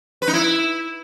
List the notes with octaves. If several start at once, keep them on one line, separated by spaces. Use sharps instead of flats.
B4
D#4
E4